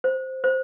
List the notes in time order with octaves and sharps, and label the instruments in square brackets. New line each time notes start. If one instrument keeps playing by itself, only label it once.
[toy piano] C5
C5